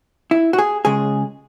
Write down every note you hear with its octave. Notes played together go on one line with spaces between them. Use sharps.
E4
F#4
G#4
C#2 C#3 G#3 G#4